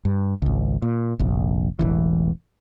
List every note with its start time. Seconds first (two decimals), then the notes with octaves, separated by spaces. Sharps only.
0.05 G2
0.42 G#1 C#2
0.82 A#2
1.19 F1 A#1
1.79 E1 A1 E3